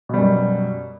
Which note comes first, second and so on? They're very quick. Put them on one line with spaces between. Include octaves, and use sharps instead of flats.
B2 G3 F#2